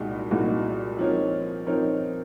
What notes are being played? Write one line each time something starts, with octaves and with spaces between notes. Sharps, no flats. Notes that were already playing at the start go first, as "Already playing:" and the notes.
Already playing: C2 A#2 G#3 D#4 F#4
C2 A#2 G#3 D#4 F#4
F3 C4 D#4 A#4 C#5
F3 C4 D#4 A#4 C#5